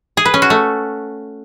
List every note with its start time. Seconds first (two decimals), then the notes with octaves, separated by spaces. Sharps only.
0.17 G#4
0.25 B4
0.34 C#4
0.42 F#4
0.50 A3